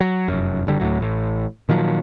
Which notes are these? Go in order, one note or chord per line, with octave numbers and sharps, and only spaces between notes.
F#3
F1 F#2
F#1 D3 G3
D2 A2 F#3
A1 A2
A#2 D#3 F3 F#3